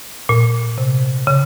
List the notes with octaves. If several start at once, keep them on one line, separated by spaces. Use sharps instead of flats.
A#2
C3
C#3